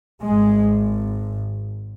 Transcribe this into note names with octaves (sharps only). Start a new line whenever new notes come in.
G#1 G#2 G#3